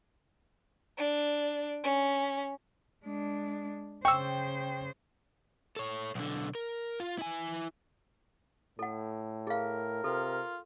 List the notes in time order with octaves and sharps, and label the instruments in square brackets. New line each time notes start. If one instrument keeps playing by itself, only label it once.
[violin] D4
C#4
[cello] G#3 D4
[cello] C#3 C5 [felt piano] G5 [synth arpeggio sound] C#6 E6
[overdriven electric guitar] A4 C#5
B1 D3
A#4
F4
E4 G#5
[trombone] A2 [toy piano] A4 F#5
[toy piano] G#4 F5 [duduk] A#4
[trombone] C3 [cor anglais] F4 [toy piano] A4